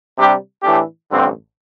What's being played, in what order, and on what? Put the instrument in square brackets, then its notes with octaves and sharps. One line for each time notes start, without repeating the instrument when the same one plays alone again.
[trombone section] C3 G3 D4 G4
A2 E3 A3 D4 G4
A1 G2 D3 C4